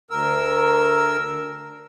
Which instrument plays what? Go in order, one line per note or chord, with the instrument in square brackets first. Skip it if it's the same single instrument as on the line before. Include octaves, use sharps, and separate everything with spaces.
[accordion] D2 A#4 E6